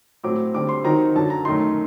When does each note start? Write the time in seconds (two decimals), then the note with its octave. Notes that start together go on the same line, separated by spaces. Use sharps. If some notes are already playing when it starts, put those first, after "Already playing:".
0.24 A2 F#3 A3 C4 D6
0.54 D3 G3 C4 D6
0.69 C6
0.84 D#3 F#3 C4 D#4 A#5
1.16 F#2 D3 F#3 A5
1.30 A#5
1.45 F#2 D#3 A3 D#4 C6